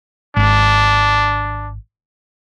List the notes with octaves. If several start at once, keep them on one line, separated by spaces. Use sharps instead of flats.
G#1 D4